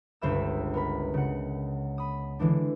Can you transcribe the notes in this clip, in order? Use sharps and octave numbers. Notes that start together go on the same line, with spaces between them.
G1 C#2 C5 E5 B5 E6
B3 A#4 B5
C#3 F#5
B5 D#6
D3 E3 G#3 D4